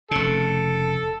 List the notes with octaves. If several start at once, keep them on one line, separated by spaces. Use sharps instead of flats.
F1 C#3 A4